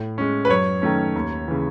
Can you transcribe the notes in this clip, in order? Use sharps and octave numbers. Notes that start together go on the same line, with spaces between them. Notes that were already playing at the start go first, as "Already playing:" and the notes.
Already playing: A2
G#3 C#4
B4
F#2 C#5
D#3 A3 C#4
D#2
C#3 E3